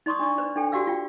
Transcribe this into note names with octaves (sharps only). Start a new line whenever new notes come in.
D#4 D5 C6 C#6 D#6
D4 D5 C#6
B4 C5 D5
D4 A4 G5
F#4 G4 D5 F5 E6
F4 G5